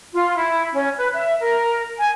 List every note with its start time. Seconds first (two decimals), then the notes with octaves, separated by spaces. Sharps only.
0.13 F4
0.37 E4
0.74 C#4
0.98 B4
1.14 E5
1.41 A#4
1.98 G#5